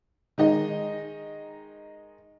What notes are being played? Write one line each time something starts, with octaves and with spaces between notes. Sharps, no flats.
D#3 G#3 D#4 D#5